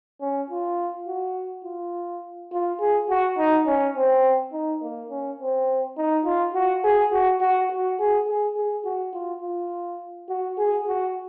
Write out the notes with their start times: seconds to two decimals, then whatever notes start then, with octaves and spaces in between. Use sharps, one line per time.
0.20 C#4
0.50 F4
1.07 F#4
1.65 F4
2.52 F4
2.80 G#4
3.09 F#4
3.38 D#4
3.66 C#4
3.96 C4
4.53 D#4
4.82 A#3
5.10 C#4
5.40 C4
5.97 D#4
6.25 F4
6.54 F#4
6.84 G#4
7.12 F#4
7.40 F#4
7.70 F#4
7.99 G#4
8.27 G#4
8.57 G#4
8.85 F#4
9.13 F4
9.42 F4
10.29 F#4
10.58 G#4
10.87 F#4